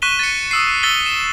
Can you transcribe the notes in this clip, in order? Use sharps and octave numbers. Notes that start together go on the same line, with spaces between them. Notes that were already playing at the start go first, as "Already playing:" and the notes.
C#6 F#6 B6 D#7 E7 G7
A6 C#7
D#6 E6 C7
E6 A6 B6 G7
E7